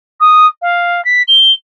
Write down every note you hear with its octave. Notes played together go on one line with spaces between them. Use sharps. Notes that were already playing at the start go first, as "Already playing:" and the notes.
D#6
F5
B6
G7